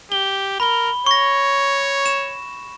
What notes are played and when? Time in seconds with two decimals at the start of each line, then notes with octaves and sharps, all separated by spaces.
0.12 G4 G7
0.60 A#4 B5 G7
1.06 C#5 C#6 A#6
2.06 E7